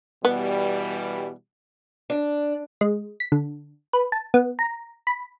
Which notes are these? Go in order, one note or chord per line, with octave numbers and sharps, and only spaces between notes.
B2 E3 G3 B3
D4
G#3
B6
D3
B4
A5
B3
A#5
B5